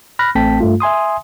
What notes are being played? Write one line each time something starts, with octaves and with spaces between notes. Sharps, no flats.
B5 F6 F#6 A#6
A1 A3 C4 G5 A5 B6
G2 A3 F4
E5 G#5 C6 D#6